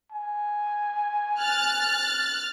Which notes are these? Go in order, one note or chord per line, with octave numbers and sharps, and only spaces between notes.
G#5
F6 F#6 A6